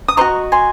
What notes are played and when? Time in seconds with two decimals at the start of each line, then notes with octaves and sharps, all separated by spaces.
0.08 D#6
0.17 C5 D#5 A#5 C#6
0.21 F#4
0.52 G#5 C6